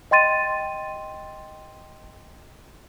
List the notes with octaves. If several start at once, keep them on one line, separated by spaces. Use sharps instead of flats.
D#5 G5 C6 A6 D#7